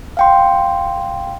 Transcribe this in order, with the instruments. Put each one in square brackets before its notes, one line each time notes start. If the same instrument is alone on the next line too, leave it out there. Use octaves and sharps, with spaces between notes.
[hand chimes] F5 G5 C6